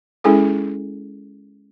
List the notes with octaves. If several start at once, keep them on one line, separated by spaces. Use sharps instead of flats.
G#3 C#4 E4 G#4 A4